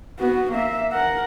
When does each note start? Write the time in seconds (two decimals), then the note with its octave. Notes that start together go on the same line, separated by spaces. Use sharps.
0.19 B3 F#4
0.52 A#3 E5
0.92 A#4 F#5